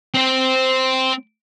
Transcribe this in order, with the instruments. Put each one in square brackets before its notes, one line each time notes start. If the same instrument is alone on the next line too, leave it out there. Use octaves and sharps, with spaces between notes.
[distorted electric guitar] C4 C5